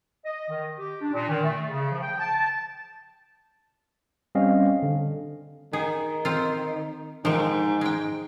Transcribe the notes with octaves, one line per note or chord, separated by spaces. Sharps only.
D#5
D#3
G4
D4
A#2
D#3
A3
C#3
F3
G5
A5
G3 C4 C#4 D#5 F5
D3
D#3 G#4
C4 F4
G#2 D#3 F3
G#3 G5